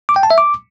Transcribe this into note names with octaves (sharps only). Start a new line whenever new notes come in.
D6
G5
A5
E5
D6